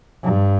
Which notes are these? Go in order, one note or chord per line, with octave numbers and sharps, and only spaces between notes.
G2